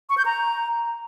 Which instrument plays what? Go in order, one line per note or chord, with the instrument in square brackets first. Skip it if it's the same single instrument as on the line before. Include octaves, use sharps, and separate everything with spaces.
[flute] C#6
G6
A#5